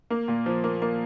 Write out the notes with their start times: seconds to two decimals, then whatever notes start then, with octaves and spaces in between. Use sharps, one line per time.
0.10 A#3
0.28 A#2
0.46 F3
0.64 A#3
0.82 A#3